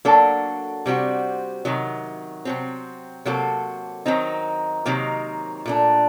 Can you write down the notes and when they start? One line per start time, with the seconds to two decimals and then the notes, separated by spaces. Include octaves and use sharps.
0.05 F#3 A#3 D4 F#4 A4
0.86 C3 G3 C4 F#4
1.65 C3 D#3 F#3
2.45 C3 F#3 C4
3.25 C3 F#3 A#3 F#4 A4
4.06 D#3 F#3 C4 D#4
4.85 C3 D#3 F#3 A#3 D#4
5.66 A#2 A3 D4